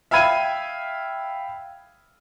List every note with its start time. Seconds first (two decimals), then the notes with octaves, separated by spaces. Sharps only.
0.11 E5 F5 G5 B5 G#6 D#7